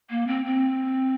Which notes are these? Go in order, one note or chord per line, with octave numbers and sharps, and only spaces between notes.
A#3
C4
C4